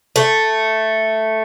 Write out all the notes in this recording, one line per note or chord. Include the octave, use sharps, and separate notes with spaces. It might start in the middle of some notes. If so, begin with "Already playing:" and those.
A3